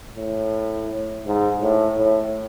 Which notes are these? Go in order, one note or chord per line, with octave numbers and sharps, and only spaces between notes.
A2
G#2
A2
A2